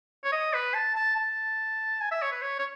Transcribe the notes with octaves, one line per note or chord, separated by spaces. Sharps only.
C#5
D#5
B4
A5
A5
A5
G#5
E5
C#5
B4
C#5
C#5